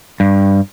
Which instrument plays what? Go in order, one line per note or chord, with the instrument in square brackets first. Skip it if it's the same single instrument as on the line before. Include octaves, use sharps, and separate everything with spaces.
[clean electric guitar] G2